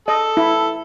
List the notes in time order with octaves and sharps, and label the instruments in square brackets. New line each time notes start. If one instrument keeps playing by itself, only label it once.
[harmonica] A4 [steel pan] D#5
[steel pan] E4